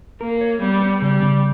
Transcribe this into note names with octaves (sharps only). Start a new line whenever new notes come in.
A#3 A#4
C#5
G3 B3
B3
C#3 G3
C#3